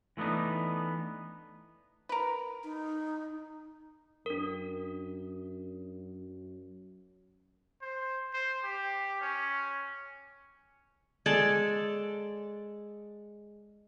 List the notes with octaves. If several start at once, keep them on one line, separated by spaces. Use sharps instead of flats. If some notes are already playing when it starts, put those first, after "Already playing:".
E3 A3 B3 D4 D#4
A#4 B4
D#4
F#2 D4 A#4
C5
C5
G4
C#4
G#3 A4 D5 A5